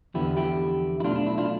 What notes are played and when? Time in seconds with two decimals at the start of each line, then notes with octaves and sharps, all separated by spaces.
0.14 E2 D3 F3 B3 E4 G4
0.37 E4 G4
1.00 E4
1.04 B1 B2 A3 D4 F4
1.16 D4
1.27 E4
1.38 D4 F4